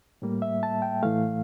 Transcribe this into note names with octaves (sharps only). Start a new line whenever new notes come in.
A2 G3 A#3
E5
A5
G5
A2 E3 A3 F5